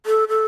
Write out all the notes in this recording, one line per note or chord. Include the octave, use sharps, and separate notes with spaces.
A4
A4